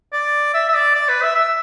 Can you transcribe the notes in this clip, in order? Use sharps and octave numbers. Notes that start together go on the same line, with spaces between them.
D5
E5
E5
D5
D5
B4
E5
E5